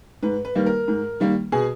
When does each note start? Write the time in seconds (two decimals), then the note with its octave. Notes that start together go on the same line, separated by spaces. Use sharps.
0.23 G#2 B4
0.45 B4
0.55 D#3 G3 A#3
0.66 A#4
0.88 G#2
1.20 D#3 G3 A#3
1.52 B2 G#4